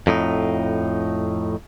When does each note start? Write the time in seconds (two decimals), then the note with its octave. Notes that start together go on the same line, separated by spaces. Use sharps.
0.07 F2 A2 D#4